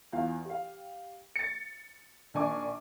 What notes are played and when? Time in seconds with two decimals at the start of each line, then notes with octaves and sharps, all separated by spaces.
0.13 E2 F4 F5
0.45 G4 F5
1.36 A6 C#7
2.34 A#1 D#3 D4 G#5 C#6 D6